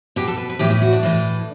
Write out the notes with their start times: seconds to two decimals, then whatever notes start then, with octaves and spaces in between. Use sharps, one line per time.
0.16 B2 G4
0.28 A4
0.37 B4
0.49 B4
0.59 A2 E3 G4
0.70 E4
0.82 F#4
0.93 D4
1.03 A2 E3